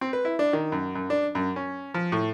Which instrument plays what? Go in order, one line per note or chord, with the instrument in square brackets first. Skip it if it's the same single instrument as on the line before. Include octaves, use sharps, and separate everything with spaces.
[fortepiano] C4
B4
E4
D4
D#3
F#2
F#2
D4
F#2
C#4
F3
A2